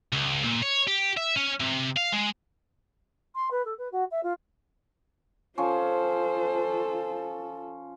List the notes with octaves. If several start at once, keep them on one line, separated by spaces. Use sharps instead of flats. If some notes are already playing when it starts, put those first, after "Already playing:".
C#2
A#2
C#5
G4
E5
C#4
C3
F5
G#3
C6
B4
A4
B4
F#4
E5
F4
F3 C#4 F4 A4 C5